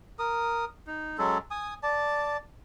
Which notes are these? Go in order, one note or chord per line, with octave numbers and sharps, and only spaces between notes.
A#4 D#6
D#4
F#3 G#3 C#4 A4
G#5 D#6
D5 A5